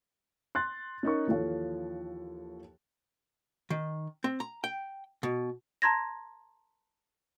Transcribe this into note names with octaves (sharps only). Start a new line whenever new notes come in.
C6 F#6 A6
C#4 D#4 A#4 C#6
D#2 E3 F3 A4 C#5
D#3
C4
A#5
G5
B2
A5 A#5 C6 G#6 A#6